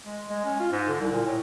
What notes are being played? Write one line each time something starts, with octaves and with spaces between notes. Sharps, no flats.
G#3
G#3
C#4
F4
G#2
D3
C2
A#2
A2